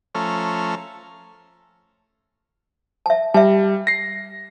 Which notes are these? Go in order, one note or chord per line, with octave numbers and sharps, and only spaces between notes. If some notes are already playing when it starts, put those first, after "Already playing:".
F3 A3 C#4 A4 A#5 F6
E5 A5
G3 E5 A5
A#6 C7